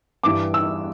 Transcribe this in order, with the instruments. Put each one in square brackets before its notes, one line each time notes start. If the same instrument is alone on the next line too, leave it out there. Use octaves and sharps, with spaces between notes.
[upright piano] G2 E3 G3 D6
E6